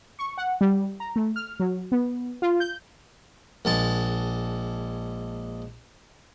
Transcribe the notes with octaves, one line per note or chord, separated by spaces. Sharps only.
C#6
F#5
G3
A#5
A3
F6
F#3
B3
F4
G6
A#1 G#3 A5